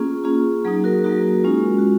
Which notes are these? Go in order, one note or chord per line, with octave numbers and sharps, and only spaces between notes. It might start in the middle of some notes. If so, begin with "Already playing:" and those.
Already playing: A#3 C#4 F4 G#4
A#3 C#4 F4 G#4
F#3 A#3 D#4 G#4
F#4 A#4
F#3 A#3 D#4 F#4
G#3 C#4 F4
F#4